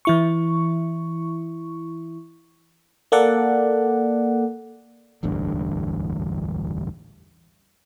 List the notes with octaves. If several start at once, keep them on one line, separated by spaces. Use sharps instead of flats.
E3 E4 C#6
A#3 A4 D5 F#5
E1 A1 D2 G2